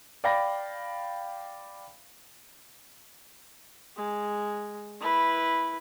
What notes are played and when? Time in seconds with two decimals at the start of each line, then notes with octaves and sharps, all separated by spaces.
0.24 D5 F5 G5 B5 A#6
3.96 G#3
5.00 E4 B4